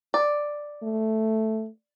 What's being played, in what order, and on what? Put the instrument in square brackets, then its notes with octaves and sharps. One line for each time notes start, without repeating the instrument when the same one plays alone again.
[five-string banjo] D5
[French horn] A3